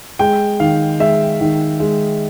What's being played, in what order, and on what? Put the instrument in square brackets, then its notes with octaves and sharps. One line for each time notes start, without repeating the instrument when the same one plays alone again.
[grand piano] G#3 [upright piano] G5
[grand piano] D#3 [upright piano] F5
[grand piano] G#3 [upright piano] E5
[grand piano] D#3
G#3